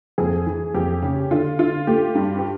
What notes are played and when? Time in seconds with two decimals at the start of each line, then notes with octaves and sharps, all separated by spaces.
0.18 F2 G#4
0.47 E3
0.74 F2 G4
1.02 C#3
1.31 D3 F4
1.59 D3 F4
1.87 A3 G4
2.15 G2
2.39 G4